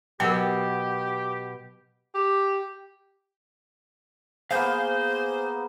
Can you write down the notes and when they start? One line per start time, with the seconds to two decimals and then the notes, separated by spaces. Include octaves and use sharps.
0.20 B2 F#3 G4 A#4 G5
2.15 G4
4.51 A#3 B3 G#4 C5 F5 G6